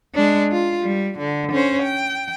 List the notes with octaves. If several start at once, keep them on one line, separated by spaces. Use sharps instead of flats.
G#3 D4
F4
G3
D3
C#4 C5
G5